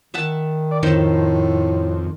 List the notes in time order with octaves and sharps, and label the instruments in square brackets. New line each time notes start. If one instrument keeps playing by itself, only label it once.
[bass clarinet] D#3 [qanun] E5 F#5 A5
[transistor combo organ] D5
[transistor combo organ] F2 [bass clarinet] A2 [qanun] D#3 A4 C5